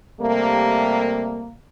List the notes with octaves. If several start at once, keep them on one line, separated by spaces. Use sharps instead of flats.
C3 G3 A3 A#3